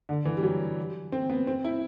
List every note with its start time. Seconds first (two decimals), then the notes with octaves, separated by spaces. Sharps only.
0.09 D3
0.25 E3
0.37 G3
0.43 F#3
1.12 C4
1.30 B3
1.47 C4
1.65 E4